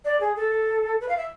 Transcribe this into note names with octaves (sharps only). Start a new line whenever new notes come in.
D5
G#4
A4
B4
F5
E5